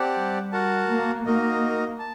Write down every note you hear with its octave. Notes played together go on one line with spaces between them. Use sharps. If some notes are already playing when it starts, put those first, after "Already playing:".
Already playing: C4 G4 D5 F#5 A5
G3
F#4 A#4 F#5 A5
A#3
A#3 D#4 F#4 A#4 D#5
A5